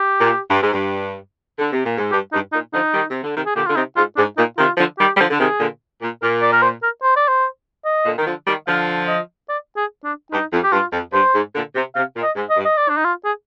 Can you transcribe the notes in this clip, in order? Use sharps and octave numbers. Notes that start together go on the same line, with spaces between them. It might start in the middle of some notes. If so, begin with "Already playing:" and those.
Already playing: G4
A#2
G2
G#2
G2
D3
C3
A#2
G#2
G2 G4
G2 D#4
A#2 D#4
D3 F3 D#4
D#3 G3
C3
D3
C3 D#3
G#4
A#2 D3 G4
D3 F4
C3 D#4
G#2 F4
G#2 D4
A#2 D#4
C3 D#3 F4
D3 F3
D#3 G3 G4
G3
D3 F3
D3
C3 D#3 G#4
A#2 D3
A#2
A#2 A#4
D5
A#4
C5
A#4
C5
D5
C5
D#5
A#2 D3
D#3
D3 F3
D#3 G3
D3 F3 F5
D#5
D5
G#4
D4
G2 D#4
F2
G4
G2 F4
F2
G2 C5
G#2
A#2 D3
C3
C3 F5
A#2
D#5
G#2
D#5
G2
D#5
D5
D4
D#4
F4
G#4